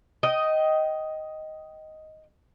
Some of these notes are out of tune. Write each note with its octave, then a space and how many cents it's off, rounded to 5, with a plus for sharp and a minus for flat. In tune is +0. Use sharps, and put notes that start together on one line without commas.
D#5 +5 G5 -20